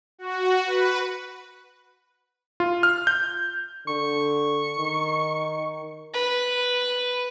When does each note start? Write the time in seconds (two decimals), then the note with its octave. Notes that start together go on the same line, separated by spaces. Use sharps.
0.18 F#4
0.66 B4
2.60 F4
2.83 F6
3.07 G6
3.88 D3 C#6
4.78 D#3
6.14 B4